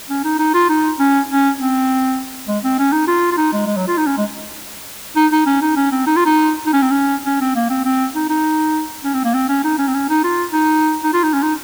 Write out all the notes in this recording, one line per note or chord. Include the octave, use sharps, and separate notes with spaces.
C#4
D#4
D#4
F4
D#4
C#4
C#4
C4
G#3
C4
C#4
D#4
F4
F4
D#4
G#3
G#3
F#3
F4
D#4
C#4
G#3
D#4
D#4
C#4
D#4
C#4
C4
D#4
F4
D#4
D#4
C#4
C4
C#4
C#4
C4
A#3
C4
C4
D#4
D#4
C#4
C4
A#3
C4
C#4
D#4
C#4
C4
C#4
D#4
F4
D#4
D#4
F4
D#4
C#4
D#4